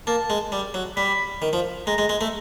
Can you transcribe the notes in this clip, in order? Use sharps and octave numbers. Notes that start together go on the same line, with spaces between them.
A#3 A5
G#3
G3
F#3
G3 B5
D#3
F3
G#3 A#5
G#3
G#3
A3